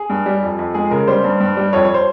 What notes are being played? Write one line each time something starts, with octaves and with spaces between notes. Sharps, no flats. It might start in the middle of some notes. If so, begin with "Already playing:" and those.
Already playing: G#4
G2
G3
F2
F2
G#3 G#4
C#3 A#4
G3 C5
G2
G2
G3
F2 C#5
C#5
C5